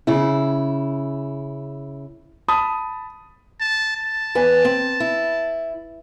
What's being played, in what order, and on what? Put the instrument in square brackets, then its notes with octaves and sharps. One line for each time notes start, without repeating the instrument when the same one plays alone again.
[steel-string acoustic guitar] C#3 E4
[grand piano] A5 B5 D#6
[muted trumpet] A5
A5
[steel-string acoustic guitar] E2 B4 G#5
C4
E4